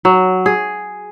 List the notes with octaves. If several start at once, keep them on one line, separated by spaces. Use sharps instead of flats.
F#3
G#4